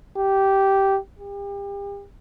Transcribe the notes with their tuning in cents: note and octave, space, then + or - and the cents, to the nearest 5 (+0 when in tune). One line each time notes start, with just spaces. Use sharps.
G4 -10
G4 +35